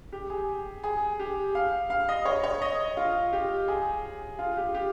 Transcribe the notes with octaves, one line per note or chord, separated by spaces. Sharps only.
G4
G#4
G#4
G4
F5
F5
D#5
C#5
C#5
D#5
F4
G4
G#4
F4
G4
G4